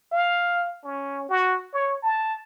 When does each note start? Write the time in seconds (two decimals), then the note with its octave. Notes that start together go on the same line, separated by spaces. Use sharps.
0.12 F5
0.84 C#4
1.29 F#4
1.73 C#5
2.03 A5